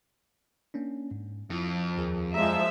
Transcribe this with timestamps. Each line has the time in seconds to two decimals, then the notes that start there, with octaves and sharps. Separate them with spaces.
0.74 A#3 C#4 D4
1.11 G#2
1.50 F2 E4 F4
1.97 D#2 G#4 A#4
2.34 F3 G#3 D5 E5 A#5